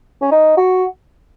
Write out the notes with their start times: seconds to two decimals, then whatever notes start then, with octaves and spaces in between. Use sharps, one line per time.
0.22 C#4
0.32 D#4
0.57 F#4